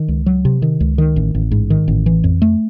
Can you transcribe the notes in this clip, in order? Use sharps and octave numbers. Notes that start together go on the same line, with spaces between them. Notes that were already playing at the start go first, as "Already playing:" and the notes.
Already playing: D#3
C#2
F#3
C3
D#3
C#2
D#3
A1
A1
G#2
D#3
A1
E3
F2
A3